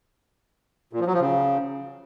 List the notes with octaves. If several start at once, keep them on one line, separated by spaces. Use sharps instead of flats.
A#2
F3
F#3
F3
C#3